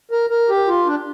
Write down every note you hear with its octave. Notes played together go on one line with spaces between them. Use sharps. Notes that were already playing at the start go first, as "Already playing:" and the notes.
A#4
A#4
G4
F4
D4